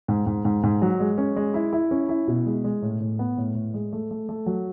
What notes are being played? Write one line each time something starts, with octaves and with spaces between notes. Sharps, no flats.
G#2
G#2
G#2
G#2
F#3
G#3
C#4
G#3
E4
E4
C#4
E4
B2
G#3
G#3
A2
A2
B3
A2
A2
G#3
A3
A3
A3
F#3